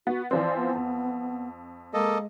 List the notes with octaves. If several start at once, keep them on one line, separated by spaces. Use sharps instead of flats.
B3 F#4
E3 F3 C4 D5
B3
F2
G#3 A#3 A4 D#5